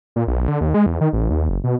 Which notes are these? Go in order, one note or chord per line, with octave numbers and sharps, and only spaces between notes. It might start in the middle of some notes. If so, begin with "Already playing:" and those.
A#2
B1
D3
D#2
G#3
E2
D#3
A1
D#2
F#1
B2